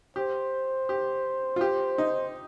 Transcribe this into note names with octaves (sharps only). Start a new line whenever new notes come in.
G4 C5
G4
F4
G4
D#4